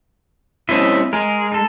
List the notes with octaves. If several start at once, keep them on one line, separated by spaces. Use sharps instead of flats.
G3 C4 C#4 E4 D#5 E5
G#3 G#4 A#4
D#4 A4